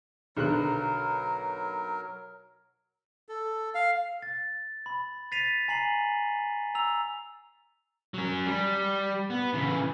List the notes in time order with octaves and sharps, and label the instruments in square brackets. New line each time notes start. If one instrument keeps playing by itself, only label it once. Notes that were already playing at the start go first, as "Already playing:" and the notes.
[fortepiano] B1 D3 F#6 [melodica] F#3 A#4
[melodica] A4
F5
[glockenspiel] A6
B5
A6 B6 C7 D#7 F7
G#5 A#5 C7 F#7
A#5 E6 F7
[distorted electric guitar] F#3 C#4
G3
B3
C#3 E3